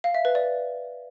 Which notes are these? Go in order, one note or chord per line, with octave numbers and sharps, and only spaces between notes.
F5
E5
B4
D5